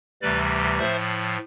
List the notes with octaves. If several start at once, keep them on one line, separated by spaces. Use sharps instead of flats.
D2 C3 E3 G3 B4 D5
A2 F3 C5 E5